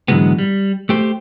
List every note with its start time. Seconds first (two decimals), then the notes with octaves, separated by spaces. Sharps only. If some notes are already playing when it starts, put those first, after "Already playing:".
0.08 G#2 D3 E3 F#3 G#3 B3
0.39 G3
0.89 A3 G4 C5